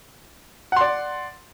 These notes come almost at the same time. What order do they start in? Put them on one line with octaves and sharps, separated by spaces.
F#5 C6 D5